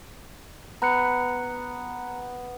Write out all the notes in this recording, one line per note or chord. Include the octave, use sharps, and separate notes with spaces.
B3 A#5 F#6 C#7